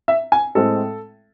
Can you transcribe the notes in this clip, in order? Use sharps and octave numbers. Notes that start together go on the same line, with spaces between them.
E5
G#5
A2 G#3 C4 A4